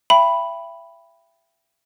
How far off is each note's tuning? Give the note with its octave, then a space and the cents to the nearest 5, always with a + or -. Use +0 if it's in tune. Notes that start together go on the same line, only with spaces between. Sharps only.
E5 +30 G5 +0 B5 +0